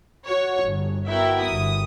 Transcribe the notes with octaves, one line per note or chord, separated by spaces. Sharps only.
F#4 C#5
G1
B3 E4 F#4 A#4 E5 G5
G1 D#6